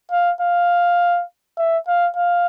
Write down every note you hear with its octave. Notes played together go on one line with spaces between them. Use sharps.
F5
F5
E5
F5
F5